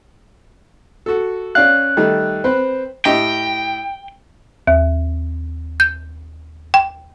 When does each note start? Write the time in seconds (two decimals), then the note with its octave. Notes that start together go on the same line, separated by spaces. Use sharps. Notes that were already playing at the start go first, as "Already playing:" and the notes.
1.06 F#4 A4
1.55 C#4 D5 F5 F#6
1.97 D#3 G3 A3
2.44 C4 B4 C5
3.05 A2 G4 D#5 G5
4.67 D#2
5.80 G6
6.74 G5